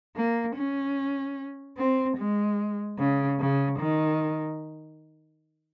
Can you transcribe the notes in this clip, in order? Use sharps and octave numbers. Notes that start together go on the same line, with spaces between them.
A#3
C#4
C4
G#3
C#3
C#3
D#3